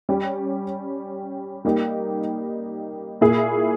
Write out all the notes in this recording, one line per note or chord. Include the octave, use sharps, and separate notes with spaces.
G3 C#4 G4
G3 A#3 D#4 G4
A#2 A#3 E4 G#4